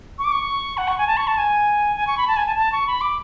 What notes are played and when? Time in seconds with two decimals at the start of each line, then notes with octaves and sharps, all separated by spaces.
0.19 C#6
0.25 D6
0.32 C#6
0.78 F#5
0.88 C#6
0.98 G#5
1.07 A5
1.17 C#6
1.27 A5
1.38 G#5
1.97 G#5
2.07 C#6
2.18 B5
2.28 A5
2.37 G#5
2.46 A5
2.56 A5
2.72 C#6
2.87 B5
3.01 D6